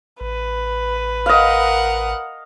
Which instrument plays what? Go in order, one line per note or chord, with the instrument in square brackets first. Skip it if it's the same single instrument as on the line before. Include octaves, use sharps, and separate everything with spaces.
[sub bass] A1 [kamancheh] B4
[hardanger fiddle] A#4 F#5 [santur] D#5 F5